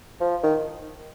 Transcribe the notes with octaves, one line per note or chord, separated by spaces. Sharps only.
F3
D#3